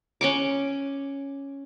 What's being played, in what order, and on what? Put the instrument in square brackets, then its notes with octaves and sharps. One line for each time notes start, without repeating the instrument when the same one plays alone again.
[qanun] C#4 C#6 D6